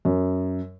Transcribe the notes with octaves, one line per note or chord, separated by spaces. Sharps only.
F#2